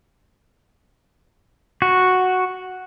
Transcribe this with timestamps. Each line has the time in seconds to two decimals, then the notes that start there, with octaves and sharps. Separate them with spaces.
1.82 F#4